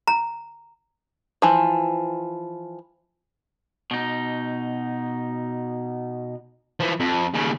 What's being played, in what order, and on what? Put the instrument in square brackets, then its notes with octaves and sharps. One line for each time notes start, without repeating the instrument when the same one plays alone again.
[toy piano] A#5
[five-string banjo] E3 F3
[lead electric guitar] B2 D#4
[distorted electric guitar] E3 F3
F2
D#2 C#3